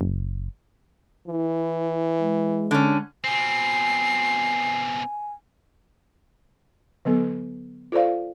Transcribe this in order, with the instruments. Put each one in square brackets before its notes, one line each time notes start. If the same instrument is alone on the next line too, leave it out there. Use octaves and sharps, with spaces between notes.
[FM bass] F#1
[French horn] E3 [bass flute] E4
[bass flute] G#3
[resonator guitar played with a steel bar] D3 C#4
[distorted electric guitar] B2 C4 [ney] G#5 [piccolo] C7
[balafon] D3 F#3 B3 A4
F4 A4 C5 D5 F5